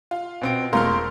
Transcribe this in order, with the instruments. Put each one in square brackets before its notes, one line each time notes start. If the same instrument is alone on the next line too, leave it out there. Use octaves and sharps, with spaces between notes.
[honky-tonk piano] F4
[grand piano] B2 C4 D7
[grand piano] E1 A3 F6 [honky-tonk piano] F4 A#4 C6